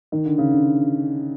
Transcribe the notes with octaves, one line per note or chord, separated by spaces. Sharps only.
D#3
D3
C#3
D3